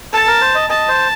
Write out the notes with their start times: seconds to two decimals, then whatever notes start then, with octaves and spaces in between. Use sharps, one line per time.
0.13 A4 A5
0.27 A#4
0.41 C5
0.55 D#5
0.70 D#5 A5
0.88 C5